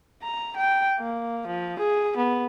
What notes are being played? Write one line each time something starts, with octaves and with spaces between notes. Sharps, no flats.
A#5
G5
A#3
F3
G#4
B3